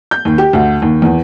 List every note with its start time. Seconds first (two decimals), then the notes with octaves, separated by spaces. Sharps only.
0.11 G6
0.25 D#2
0.38 G4
0.53 D2
0.82 D#2
1.02 E2